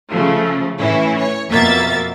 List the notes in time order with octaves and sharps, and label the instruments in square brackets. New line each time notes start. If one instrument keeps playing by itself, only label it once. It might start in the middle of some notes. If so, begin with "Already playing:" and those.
[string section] C#3 F3 A3
A2 E3 C#4 E4
C#5
F2 B2 A#3 E5 A6